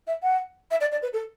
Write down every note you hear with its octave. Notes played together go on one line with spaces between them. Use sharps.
E5
F#5
E5
D5
D5
B4
A4